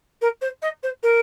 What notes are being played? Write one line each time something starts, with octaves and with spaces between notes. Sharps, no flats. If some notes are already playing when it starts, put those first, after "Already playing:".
A#4
C5
D#5
C5
A#4